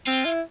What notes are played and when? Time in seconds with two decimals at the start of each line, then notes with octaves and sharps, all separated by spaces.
0.07 C4 F4
0.25 E4